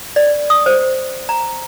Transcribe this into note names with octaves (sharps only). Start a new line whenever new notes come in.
D5
D#6
C5
A#5